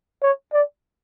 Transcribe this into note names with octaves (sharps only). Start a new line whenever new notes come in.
C#5
D5